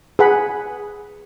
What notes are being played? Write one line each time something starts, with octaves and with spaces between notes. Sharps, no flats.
G#4 B4 F#5 B5